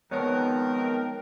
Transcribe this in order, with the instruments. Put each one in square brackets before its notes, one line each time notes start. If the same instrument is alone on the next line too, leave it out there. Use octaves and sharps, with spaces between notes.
[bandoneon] D#3 F3 C4 [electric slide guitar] G#3 B3 [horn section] D#4 A#4 [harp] C#5